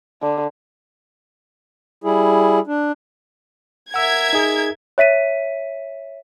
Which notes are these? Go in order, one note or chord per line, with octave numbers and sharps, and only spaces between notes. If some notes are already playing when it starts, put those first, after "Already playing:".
D3
G3 E4 G#4
D4
A#4 E5 F#5 E6 G#6
D#4 G#4
C#5 E5 B6 D#7